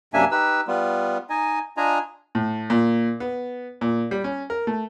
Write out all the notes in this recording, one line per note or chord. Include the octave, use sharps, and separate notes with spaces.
F#2 C3 A#3 D4 E5 G#5
D#4 G4 B4 E6
G3 B3 F4
D#4 D#5 G#5
D4 F4 D#5 G#5 A#5
A2
A#2
B3
A#2
G3
C#4
A#4
A3